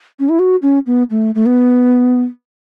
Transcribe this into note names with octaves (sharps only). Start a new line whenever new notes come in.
C#4
E4
F#4
C#4
B3
A3
A3
B3